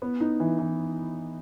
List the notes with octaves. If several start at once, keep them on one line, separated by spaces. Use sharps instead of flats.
B3
D#4
E3
E3